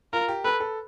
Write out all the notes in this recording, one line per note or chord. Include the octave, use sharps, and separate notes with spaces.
F4 A#4
G4
A4 B4
A4